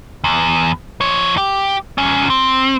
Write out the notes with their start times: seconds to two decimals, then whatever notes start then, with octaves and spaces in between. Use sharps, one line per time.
0.24 E2
1.01 F3 C#5
1.38 G4
1.98 E2 C#4
2.30 C4